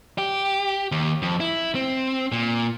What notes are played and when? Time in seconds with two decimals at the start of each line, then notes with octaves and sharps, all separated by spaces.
0.18 G4
0.92 D#2
1.22 F2
1.40 E4
1.75 C4
2.32 A#2